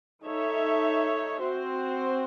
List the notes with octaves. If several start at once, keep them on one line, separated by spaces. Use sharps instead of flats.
D#4 A4 C#5 E5
C4 F#4 C5